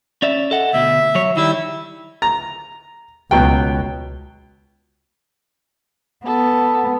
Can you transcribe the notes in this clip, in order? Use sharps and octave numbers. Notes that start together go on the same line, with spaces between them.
C#4 D5 E5
A4 D#5 F#5
D2 B2 E5
F#3 C#5
D#3 G3 E4 E6
A#5
C#2 B2 F#3 G5
B3 A4